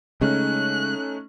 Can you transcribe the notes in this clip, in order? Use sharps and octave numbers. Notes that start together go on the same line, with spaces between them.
C#3 G#3 A3 C#4 D#4 F#6